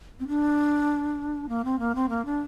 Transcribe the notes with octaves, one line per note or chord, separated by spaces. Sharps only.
C4
D4
A#3
C4
A#3
C4
A#3
D4